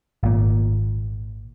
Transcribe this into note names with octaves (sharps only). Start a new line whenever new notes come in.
G#1 A#2